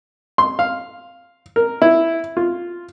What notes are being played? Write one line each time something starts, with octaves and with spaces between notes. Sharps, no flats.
C6
F5
A#4
E4
F4